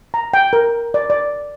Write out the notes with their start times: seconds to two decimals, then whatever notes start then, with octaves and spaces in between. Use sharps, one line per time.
0.14 A#5
0.34 G5
0.53 A#4
0.94 D5
1.10 D5